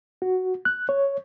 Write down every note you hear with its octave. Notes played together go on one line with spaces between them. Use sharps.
F#4
F#6
C#5